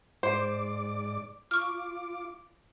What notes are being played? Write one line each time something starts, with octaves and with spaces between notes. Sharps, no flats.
G#2 C5 D5 D6
F4 C#6 D6 F6